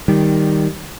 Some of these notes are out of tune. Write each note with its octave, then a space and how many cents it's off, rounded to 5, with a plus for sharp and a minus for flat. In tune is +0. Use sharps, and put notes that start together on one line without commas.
D#3 +0 G3 +0